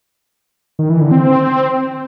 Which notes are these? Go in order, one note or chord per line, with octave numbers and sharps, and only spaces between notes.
D#3
E3
D3
C4